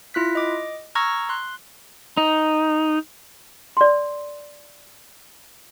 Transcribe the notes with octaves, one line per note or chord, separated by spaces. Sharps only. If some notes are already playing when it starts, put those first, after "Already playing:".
E4 F4 F#6 B6
D#5 D6
A#5 C#6 E6 F6 G#6 A#6
C6 F#6
D#4
D5 C6